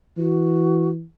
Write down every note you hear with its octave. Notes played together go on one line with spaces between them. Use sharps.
E3 F#4